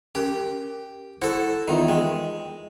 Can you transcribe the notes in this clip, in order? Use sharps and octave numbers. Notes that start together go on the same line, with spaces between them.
C#4 G4 A#4
E4 F#4 A4 C5
E2 D#3 D#4 F4
G#3 G#4 D#5 G5